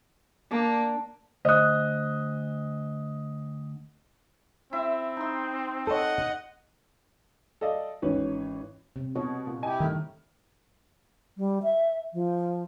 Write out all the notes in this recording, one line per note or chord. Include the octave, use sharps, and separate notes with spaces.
A#3 D4 D6
D2 C5 D#5 D#6 F#6
C4 E4 E5
D#4 C6
A4 C#5 D#5 F#5
A4 D5 D#5 F5
G#1 E3 C#4 B4 C#5
C3
B2 C#5
A#2
E4 G4 D#5 G#5
G2 D#3 A3 F6
G3
E5
F3